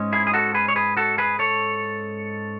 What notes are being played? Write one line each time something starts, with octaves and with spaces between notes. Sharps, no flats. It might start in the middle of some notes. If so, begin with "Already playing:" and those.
Already playing: G#2 G#3 C#4
E4 G#4
G#4
F#4 A4
G#4 B4
C#5
G#4 B4
F#4 A4
G#4 B4
A4 C#5